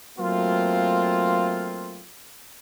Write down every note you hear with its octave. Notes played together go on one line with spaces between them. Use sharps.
F#3 A3 A#3 C4 F4